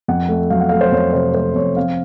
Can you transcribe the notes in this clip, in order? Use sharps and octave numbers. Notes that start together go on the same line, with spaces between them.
F2 F#5
A3
F#3 F5
F#5
A3 F5
C5
F2 C#5
C3 C5
A3 C5
F2 C#5
C4 F5